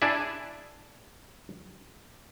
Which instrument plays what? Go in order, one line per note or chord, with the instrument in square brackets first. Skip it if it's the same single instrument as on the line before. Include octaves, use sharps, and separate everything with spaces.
[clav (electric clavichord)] D4 E4 G#4 D5 E5